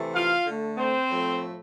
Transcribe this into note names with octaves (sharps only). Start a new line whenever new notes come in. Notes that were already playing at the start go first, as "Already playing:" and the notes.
Already playing: C3 E3 A3
F4 F5
D3 A3
C4 C5
A2 F3 A3